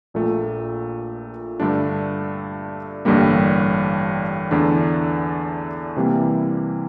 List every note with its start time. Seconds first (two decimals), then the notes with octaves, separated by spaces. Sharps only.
0.14 A#1 A#2 A3
1.60 G2 D3 A3 D4
3.05 A1 G2 D3 G3 A#3
4.51 E2 D3 A3 D4
5.96 C3 E3 G3 A#3